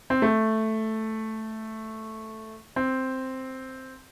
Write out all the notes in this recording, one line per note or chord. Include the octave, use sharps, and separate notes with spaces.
C4
A3
C4